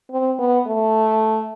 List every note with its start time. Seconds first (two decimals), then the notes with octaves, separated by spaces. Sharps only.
0.11 C4
0.38 B3
0.67 A3